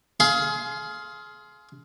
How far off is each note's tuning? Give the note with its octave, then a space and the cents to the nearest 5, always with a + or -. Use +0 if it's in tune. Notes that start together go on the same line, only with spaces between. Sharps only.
G#4 +30 F5 +0 C6 +0